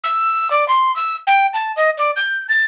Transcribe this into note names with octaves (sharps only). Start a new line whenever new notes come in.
E6
D5
C6
E6
G5
A5
D#5
D5
G6
A6